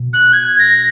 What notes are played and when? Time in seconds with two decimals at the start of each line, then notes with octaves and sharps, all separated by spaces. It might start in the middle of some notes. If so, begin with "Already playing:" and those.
Already playing: B2
0.13 F#6
0.33 G#6
0.59 A#6